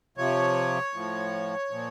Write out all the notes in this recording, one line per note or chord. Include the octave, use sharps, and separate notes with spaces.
C3 F3 C#5
A2 F3
A#2 F3